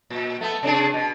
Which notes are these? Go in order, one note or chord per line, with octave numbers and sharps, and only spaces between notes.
A#2
A3 B3
C3 D4 G#4
B2